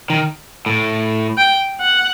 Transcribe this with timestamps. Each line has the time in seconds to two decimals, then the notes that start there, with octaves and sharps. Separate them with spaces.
0.10 D#3
0.66 A2
1.37 G5
1.80 F#5